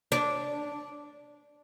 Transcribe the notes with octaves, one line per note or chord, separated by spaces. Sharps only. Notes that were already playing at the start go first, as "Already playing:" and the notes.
D4